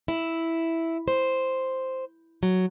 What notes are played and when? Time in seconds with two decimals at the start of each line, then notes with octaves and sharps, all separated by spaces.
0.08 E4
1.08 C5
2.43 F#3